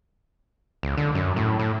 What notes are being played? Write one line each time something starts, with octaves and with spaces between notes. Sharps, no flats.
C#2
D3
F#2
A2
A2